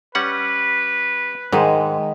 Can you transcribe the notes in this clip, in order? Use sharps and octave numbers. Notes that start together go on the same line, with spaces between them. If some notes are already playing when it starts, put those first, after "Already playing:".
G3 C#4 B4 F#5
G#2 D#3 G#3